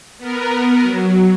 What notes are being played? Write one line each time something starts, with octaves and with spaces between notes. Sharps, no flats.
B3 A#4
F#3